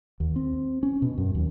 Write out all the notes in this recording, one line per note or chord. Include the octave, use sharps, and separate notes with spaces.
D#2
C4
C#4
B2
F#2
D#2